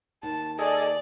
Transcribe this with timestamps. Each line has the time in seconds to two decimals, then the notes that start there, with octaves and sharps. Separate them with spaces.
0.23 D#2 A5
0.59 G#4 A4 D5 D#5